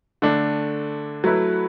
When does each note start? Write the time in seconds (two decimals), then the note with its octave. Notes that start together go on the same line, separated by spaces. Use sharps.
0.22 D3 A3 D4
1.24 F#3 A3 E4 B4